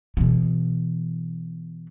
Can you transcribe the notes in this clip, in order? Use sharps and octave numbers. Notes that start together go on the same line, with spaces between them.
B2 E3